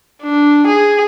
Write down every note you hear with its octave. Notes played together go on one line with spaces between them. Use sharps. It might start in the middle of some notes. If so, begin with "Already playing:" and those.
D4
G#4